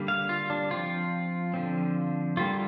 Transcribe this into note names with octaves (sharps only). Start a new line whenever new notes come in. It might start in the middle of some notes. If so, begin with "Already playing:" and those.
Already playing: D3 G3 A#3
F5
F4
D4
F3 C4 F4
D3 F3 C4
D3 G3 A#3 F4